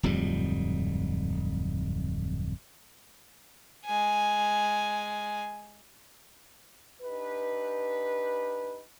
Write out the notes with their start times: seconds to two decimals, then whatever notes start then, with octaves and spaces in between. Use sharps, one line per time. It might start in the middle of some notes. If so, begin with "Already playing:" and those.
0.03 D1 F2 G#2 G3
3.85 G#3 G#5
7.02 D4 D#4 G4 B4